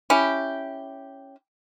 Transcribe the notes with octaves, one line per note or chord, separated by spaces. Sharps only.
C#4 E4 G4